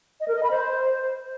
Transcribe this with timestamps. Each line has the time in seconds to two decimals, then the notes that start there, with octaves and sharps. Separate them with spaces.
0.20 D#5
0.28 A#4
0.36 D#5
0.43 B5
0.51 C5